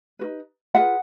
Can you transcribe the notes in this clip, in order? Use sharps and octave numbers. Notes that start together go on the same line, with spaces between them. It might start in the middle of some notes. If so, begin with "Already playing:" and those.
D#4 F#4 B4
F4 G#4 B4 E5 F#5